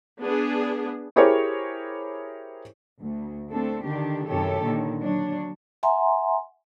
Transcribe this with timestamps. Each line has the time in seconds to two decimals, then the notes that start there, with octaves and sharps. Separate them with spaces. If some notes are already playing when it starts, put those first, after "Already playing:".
0.20 B3 D4 G#4
1.16 E4 G4 G#4 A#4 C5 C#5
3.01 D2
3.50 A3 C4 D4 A4
3.84 D3 D#3 D4 G4
4.29 F#2 C3 D#3 G4 A4 C#5
4.64 A#2 D3 D#3
5.00 F#3 D4 C#5
5.83 E5 F#5 G#5 A#5 C6